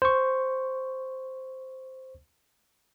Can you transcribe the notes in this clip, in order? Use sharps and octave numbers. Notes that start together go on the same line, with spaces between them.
C5 C#6